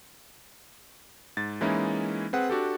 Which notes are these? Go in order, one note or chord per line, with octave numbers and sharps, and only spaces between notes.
G#2 A6
E3 G#3 A#3 C#4 D#4 E4
C4 G#4 B4 F#5
D4 F#4 G4 A4